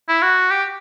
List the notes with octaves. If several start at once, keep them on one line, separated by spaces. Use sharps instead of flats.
E4
F#4
G4